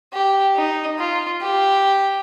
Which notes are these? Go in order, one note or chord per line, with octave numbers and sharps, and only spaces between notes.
G4
D#4
F4
G4